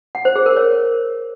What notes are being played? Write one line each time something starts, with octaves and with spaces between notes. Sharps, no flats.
F#5
C5
G#4
A#4
C#5